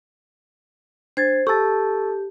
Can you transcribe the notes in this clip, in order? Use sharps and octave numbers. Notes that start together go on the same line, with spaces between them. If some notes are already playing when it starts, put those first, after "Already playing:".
D4 C5 G#6 A6
G4 A4 A5 C#6 E6 A6